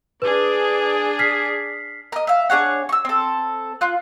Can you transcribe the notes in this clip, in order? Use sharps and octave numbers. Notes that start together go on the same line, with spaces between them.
D4 G#4 B4 D5
F6 B6 C7
A#4 D#5
E5 F5
D4 G#4 C#5 F#5
C#6 E6
C4 A4
F4 F#6